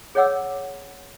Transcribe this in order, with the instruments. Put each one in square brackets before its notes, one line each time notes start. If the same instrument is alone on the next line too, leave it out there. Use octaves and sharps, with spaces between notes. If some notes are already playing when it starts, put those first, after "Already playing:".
[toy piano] G#4 C#5 D#5 F#5 D6 E6